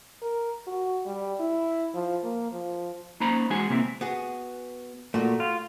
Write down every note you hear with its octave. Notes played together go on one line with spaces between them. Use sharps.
A#4
F#4
G3
E4
F3
A#3
F3
A#3 C#4 D#4 C5 A#5 B5
E2 G#3 F#4 G#4 F#5 G#5
C3 A#3 C4 E4
B3 F#4 G#4
A#2 A3 F#4
F4